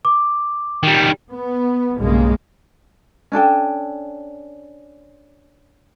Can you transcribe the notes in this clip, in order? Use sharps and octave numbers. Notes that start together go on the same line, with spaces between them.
D6
D#3 G3
B3
B1 G2 C#3 G#3 A#3
C#4 D4 A4 G5